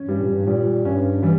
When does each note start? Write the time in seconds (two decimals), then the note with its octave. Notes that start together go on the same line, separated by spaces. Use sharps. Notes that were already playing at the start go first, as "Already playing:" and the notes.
Already playing: C#4
0.09 G2 G3
0.21 A#2
0.32 G2
0.47 A#2 G3
0.85 G2 C#4
1.23 E3 G3